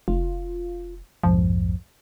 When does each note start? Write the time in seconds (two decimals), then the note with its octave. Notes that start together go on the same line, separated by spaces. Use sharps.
0.08 F1 F4
1.23 B1 F2 G#2 F3